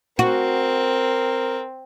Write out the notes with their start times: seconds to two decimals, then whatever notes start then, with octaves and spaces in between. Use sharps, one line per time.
0.19 C4 F#4 A#4